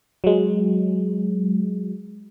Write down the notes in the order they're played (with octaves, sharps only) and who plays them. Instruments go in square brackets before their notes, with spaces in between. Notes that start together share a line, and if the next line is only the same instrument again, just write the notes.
[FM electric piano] F#3 G#3